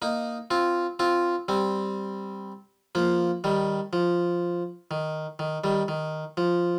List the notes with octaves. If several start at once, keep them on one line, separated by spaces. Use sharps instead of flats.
A#3 D#4
C4 F4
C4 F4
G3 C4
F3 A#3
D#3 G3
F3
D#3
D#3
D#3 G3
D#3
F3